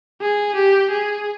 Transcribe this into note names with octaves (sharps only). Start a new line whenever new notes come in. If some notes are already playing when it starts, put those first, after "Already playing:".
G#4
G4
G#4